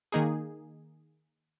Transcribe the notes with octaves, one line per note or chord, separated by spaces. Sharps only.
D#3 A#3 D#4 G#4